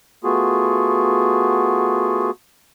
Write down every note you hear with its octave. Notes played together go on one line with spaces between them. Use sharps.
A3 B3 F4 F#4 G#4